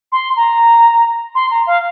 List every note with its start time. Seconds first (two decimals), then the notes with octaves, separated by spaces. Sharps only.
0.12 C6
0.36 A#5
1.35 C6
1.51 A#5
1.67 F5